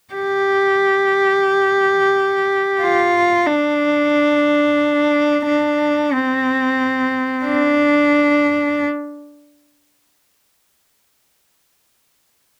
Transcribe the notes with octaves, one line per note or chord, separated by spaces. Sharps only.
G4
F4
D4
D4
C4
D4